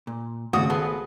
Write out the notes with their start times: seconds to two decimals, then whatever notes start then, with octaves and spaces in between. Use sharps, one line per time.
0.07 A#2
0.53 G#1 A2 C#3 F#4 D#6
0.70 B3 G#4 A4 A5